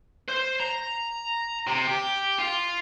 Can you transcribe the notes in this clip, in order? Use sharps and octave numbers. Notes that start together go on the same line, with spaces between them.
C5
A#5
C3
G4
F4